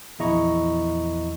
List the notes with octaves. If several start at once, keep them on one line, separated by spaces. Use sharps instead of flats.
A#1 E2 E4 D#5 A#5 C#6